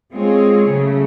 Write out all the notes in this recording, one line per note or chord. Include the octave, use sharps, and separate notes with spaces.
G#3 C4 F4 G#4 C#5
C#3 F#3 A3